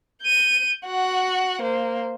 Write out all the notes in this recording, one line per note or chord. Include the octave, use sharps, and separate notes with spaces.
G6 D#7
F#4 F#5
A#3 C5